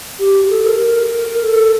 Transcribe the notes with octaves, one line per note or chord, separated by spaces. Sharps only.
G4
G4
A4
A#4
A4